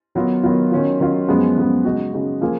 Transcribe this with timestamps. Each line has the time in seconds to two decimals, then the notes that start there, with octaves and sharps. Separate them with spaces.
0.15 D#3 F#3 B3 F4
0.43 D#3 F#3 B3 F4
0.72 D#3 F#3 C#4 F4
1.00 D#3 F#3 C#4 F4
1.28 F#2 F3 G#3 B3
1.57 F#2 F3 G#3 B3
1.85 C#3 G#3 D#4 F#4
2.13 C#3 G#3 D#4 F#4
2.41 F3 A#3 F4 G#4